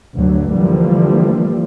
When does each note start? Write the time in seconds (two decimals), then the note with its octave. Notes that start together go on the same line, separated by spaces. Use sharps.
0.15 D2 G2 D3 F#3
0.53 D3 E3 F3 G3 A3 A#3